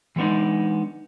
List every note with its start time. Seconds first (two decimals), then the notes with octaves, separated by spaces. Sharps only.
0.16 E3 G3 G#3 B3 D4 D#4